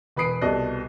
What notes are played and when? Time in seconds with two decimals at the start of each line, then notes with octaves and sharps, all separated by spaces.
0.17 E1 B4 B5 D#6 C7 D7
0.41 C2 B2 A4 D5 D#5 F#6